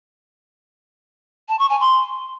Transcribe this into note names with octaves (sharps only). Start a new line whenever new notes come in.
A5
C#6
G#5
C6